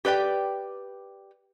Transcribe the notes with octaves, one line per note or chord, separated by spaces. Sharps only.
G4 B4 D5 G5